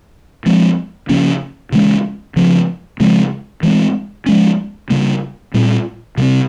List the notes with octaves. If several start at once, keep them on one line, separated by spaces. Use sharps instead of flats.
F3 G#3 C4
C#3 F3 A#3 C#4
C#3 E3 G#3 C#4
C#3 F3 C4
C#3 F3 G#3 C4
E3 G#3 C4
F3 G#3 C#4
C#3 G3 A#3
A#2 G3 C4
C3 G3 C4